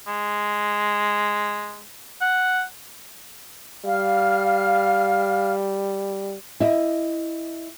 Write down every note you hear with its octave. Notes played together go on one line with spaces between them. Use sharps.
G#3
F#5
G3 F5 F6
E4 D#5